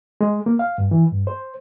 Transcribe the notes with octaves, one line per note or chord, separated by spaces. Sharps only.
G#3
A#3
F5
G2
E3
G2
C5